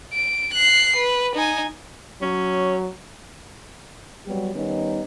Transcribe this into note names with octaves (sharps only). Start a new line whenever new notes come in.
D7
F#6 C7
B4
D#4 G#5
F#3 C#4
F#3 G3 B3 G4
D#3 G3 B3 C#4 D#4